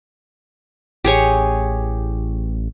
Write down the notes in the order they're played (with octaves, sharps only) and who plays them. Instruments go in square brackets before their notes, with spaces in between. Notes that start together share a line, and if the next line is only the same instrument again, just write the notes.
[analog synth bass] A1 [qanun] G4 G#4 C#5